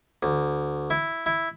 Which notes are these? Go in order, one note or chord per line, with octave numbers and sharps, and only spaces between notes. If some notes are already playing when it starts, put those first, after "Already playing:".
D2
E4
E4